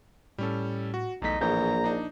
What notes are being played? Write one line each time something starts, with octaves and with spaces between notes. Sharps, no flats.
A2 G3 C#4 A4
F#4
B1 E2 A3 D#4 B6
A#1 A2 E3 G#4 A#5 G6
D4 D#4